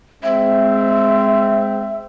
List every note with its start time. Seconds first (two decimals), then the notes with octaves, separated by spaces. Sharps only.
0.23 G#3 C4 E5